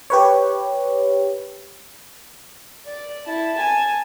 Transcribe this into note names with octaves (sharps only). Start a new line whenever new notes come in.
G4 B4 C#5
D5
E4 A5
G#5 A5